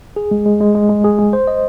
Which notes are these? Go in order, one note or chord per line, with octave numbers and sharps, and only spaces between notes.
G#4
G#3
G#3
G#3
G#3
G#3
G#4
G#3
C5
D#5